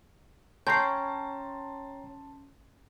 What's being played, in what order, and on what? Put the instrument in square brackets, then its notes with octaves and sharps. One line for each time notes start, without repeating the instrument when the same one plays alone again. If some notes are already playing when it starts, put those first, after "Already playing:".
[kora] C#4 [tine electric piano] C#5 G5 A#5 [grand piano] A5 C6 [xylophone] G6 C7